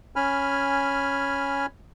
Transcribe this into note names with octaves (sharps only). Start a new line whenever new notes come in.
C#4 G#5 B5 F6